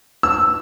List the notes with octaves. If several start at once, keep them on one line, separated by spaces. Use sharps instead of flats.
E6